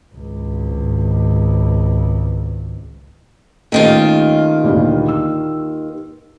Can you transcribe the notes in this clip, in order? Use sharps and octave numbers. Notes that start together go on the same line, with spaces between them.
G#1 C#2
D#2 D#3 A3 C#4 F4
D2 G2 A#2
E6